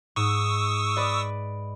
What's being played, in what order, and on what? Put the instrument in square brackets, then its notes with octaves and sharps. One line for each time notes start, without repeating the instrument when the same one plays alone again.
[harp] G#2 [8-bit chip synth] C#6 D#6 E6
[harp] B4 D5 D#5